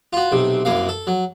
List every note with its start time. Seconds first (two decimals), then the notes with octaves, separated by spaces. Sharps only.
0.13 F4 F#4
0.32 B1 C3
0.65 C2 F#2 A#3 F5
0.89 A4
1.07 F#3